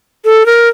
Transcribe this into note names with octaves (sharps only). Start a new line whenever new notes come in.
A4
A#4